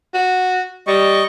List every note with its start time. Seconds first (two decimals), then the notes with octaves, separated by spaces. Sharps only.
0.14 F#4
0.87 G3 D#5 C#6